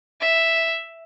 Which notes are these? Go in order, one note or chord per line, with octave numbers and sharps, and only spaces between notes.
E5